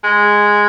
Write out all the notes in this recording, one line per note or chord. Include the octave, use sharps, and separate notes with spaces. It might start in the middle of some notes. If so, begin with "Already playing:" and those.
G#3